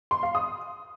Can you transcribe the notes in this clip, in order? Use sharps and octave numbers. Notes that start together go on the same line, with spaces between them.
C6
F5
D#6